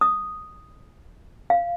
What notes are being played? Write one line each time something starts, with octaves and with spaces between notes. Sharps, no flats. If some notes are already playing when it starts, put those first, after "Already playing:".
D#6
F5